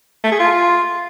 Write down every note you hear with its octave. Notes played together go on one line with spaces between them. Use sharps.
A3
G#4
F4